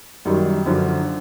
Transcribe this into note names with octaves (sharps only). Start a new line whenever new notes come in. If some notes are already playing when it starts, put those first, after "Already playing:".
F#2 D#3 G3
F#2 D3 F3